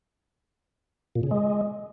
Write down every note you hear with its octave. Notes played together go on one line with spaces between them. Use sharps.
A#2
C#3
G#3